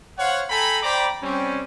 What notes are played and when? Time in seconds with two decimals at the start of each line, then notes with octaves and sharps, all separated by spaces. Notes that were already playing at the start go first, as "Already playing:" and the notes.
0.18 C5 C#5 F5 F#5
0.50 A4 G5 G#5 A#5 B5
0.83 C5 D5 G5 A#5 B5 D6
1.23 G3 C4 C#4